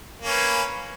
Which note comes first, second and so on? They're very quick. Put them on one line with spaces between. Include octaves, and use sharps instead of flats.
A#3 C#4 B4